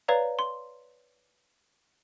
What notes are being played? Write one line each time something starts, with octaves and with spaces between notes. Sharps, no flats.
B4 C#5 D5 F5 A#5
C6